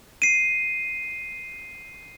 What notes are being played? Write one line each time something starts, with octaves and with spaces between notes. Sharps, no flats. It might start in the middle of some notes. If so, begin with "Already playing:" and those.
C7 D#7